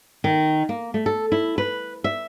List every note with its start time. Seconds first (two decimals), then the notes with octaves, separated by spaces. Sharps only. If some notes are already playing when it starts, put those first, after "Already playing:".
0.24 D#3
0.69 A#3
0.94 A3
1.06 A4
1.32 E4
1.58 B4
2.04 E5